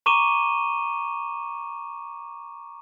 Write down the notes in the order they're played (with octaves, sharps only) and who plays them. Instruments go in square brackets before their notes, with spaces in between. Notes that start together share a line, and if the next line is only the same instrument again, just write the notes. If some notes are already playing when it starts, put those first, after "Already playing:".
[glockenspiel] A#5 C#6 D6 D#7 E7 G7